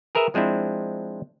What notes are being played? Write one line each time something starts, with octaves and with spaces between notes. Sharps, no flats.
G#4 A#4 B4 E5
F3 G#3 C4 D4 E4